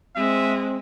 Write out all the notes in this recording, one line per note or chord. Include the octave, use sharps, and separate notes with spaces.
G#3 C4 E5